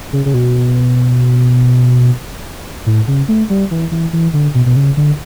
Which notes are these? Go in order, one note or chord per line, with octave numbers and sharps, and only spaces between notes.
C#3
C#3
B2
A2
C#3
A3
G3
E3
E3
E3
D3
B2
B2
C#3
D3